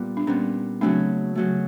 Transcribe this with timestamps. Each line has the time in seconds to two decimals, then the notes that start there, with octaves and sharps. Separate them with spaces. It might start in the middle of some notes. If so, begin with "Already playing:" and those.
Already playing: A#2 G3 B3 F4
0.17 D4
0.27 A#2 G3 B3 C#4
0.81 C#3 F#3 A3 C4 D4
1.35 C#3 F#3 A3